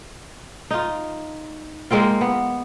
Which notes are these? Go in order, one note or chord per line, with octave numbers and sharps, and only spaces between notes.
D#4 F4
G#3 A#3 C4 F4
B3